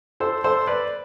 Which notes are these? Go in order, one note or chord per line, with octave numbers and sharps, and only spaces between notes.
A4 C5
A4 C5
B4 D5